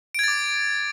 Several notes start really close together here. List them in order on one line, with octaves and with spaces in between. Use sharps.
D7 G#6 A6 D6